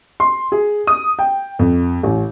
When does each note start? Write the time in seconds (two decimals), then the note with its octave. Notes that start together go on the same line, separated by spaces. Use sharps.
0.20 C6
0.52 G#4
0.87 D#6
1.19 G5
1.59 F2
2.03 A1